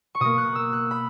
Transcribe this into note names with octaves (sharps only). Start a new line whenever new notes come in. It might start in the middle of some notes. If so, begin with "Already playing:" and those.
C#6
B2 A#3 D#6
F#6
E6
F#6
B5